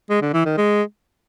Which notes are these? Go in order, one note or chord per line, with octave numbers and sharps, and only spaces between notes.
G#3
D3
E3
D#3
G#3